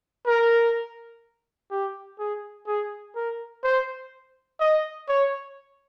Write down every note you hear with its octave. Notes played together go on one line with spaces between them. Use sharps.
A#4
G4
G#4
G#4
A#4
C5
D#5
C#5